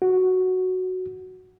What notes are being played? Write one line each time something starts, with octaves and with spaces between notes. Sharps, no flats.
F#4